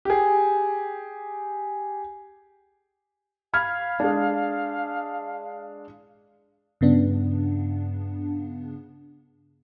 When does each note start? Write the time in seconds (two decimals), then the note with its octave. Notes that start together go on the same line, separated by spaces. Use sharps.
0.05 G4 G#4
3.54 F5 B5 F6 G#6
4.00 G#3 D4
6.81 G2 C#3 B3 D4